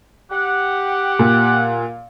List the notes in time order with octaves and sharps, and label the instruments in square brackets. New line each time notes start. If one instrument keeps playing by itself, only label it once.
[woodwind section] G4 F#5
[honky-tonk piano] A#2